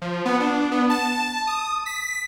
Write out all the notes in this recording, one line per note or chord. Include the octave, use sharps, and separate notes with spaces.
F3
B3
D4
B3
A5
D#6
B6